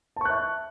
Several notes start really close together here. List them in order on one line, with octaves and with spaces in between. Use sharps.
A5 C#6 F#6 E5